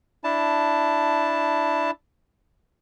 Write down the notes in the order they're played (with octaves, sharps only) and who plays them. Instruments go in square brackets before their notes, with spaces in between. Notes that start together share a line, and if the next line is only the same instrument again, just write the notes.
[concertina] D4 E4 A5